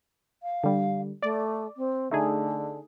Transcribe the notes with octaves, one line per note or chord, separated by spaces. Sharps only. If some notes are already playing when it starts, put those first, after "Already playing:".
F5
D3 G3
A3 D5
C4
D3 A3 D#4 G#4